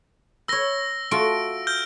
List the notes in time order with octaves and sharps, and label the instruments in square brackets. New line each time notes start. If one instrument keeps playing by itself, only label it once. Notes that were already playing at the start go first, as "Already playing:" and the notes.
[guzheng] B4 C#5 [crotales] E6 A#6 G7
[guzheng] A3 F4 F#4 [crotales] D7
[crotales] F6 G6 G7